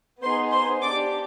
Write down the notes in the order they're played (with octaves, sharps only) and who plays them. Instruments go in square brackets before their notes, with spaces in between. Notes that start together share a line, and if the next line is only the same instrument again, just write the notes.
[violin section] B3 D#4 G#4 C5 C6
C5 C6
D4 G4 D5 D6